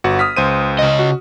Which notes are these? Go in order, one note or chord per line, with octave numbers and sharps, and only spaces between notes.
G1 F#4 F#5
D#6 F6 B6
C#2 C5 D#7
C#3 D#5
F#4